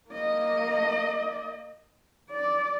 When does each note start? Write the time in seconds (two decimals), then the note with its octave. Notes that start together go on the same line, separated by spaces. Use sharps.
0.10 A#3 D#5
2.31 D5